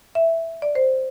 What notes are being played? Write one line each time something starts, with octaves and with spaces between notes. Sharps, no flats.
E5
D5
C5